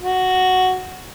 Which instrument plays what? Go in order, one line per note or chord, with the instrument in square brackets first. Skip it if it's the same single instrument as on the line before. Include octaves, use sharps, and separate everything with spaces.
[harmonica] F#4